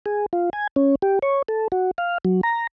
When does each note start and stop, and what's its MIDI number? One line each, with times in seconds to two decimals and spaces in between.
0.06 0.26 68
0.33 0.50 65
0.53 0.67 80
0.76 0.95 61
1.02 1.19 67
1.22 1.42 73
1.48 1.68 69
1.72 1.91 66
1.98 2.18 77
2.25 2.41 54
2.43 2.67 82